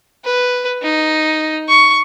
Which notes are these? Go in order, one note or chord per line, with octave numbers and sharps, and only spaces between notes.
B4
D#4
C#6